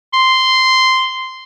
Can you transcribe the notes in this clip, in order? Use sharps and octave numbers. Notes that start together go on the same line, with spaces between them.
C6